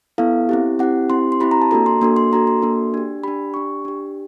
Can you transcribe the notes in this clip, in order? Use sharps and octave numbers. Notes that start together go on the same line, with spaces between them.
B3 E4 A4 F5
C4 E4 G4
C4 E4 G4 F#5
C4 E4 G4 C6
C6
C4 E4 G4 B5
A#5
A5
A#3 D4 F#4 A4 A#5
C6
A#3 D4 F#4 A4 C6
C6
A#3 D4 F#4 A4 A#5
C6
A#3 D4 F#4 A4
D4 G4
D4 G4 B5
D4 G4 C#6
D4 G4